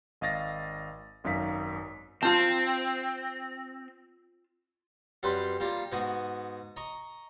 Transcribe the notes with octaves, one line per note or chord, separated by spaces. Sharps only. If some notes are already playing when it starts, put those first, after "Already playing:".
G#1 D#5 F5 A6 A#6
G#1 F#2 D#4 F5 B6
C4 F4 A5
F#2 G3 C4 G4 B4 C6
G3 A#3 F4
G#2 B3 F#4 G#5 D#6
D#5 A#5 C#6